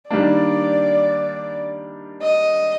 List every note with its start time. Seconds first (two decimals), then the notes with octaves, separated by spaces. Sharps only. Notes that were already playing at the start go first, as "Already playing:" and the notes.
0.10 D#3 G3 A#3 D4 D5
2.22 D#5